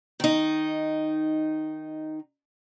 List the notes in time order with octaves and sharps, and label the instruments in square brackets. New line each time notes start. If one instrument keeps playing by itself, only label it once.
[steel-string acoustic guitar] D#3 D#4